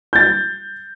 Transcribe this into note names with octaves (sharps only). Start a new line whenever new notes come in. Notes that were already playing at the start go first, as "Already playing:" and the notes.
G6 A6